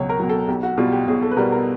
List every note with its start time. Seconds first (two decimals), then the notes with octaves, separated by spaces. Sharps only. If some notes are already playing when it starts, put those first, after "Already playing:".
Already playing: C#2 B2 F#3 C#5
0.09 A#4
0.20 B2 F#3
0.29 A4
0.48 B1 G4
0.63 F#4
0.78 B2 G3 F4
0.92 G4
1.07 B1 G#4
1.22 A4
1.31 B4
1.37 B2 G3 A#4
1.52 A#4